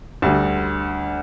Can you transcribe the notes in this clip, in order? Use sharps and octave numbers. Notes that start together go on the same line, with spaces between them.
D2 D3 G3